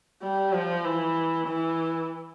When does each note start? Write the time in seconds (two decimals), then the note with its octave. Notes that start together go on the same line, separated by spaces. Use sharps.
0.22 G3
0.53 F3
0.85 E3
1.47 E3